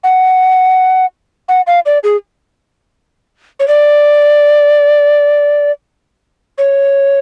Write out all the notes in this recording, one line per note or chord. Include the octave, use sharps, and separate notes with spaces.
F#5
F#5
F5
D5
G#4
C#5
D5
C#5